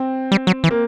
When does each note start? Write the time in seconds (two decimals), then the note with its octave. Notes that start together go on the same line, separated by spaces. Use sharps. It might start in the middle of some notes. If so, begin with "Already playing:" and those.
Already playing: C4
0.32 G3
0.47 F#3
0.64 E3
0.71 A#3